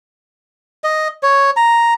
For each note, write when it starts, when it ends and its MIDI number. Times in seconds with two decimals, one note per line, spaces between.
0.84 1.08 75
1.23 1.50 73
1.57 1.94 82